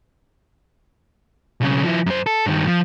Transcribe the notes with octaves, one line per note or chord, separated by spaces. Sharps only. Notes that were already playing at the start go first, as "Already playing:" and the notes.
B1 C#3
F3 E4
F#2 C5
A4
G2 D#3
F3